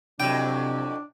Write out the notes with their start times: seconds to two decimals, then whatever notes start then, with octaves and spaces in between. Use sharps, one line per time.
0.20 F2 C3 F#3 D4 E4 G5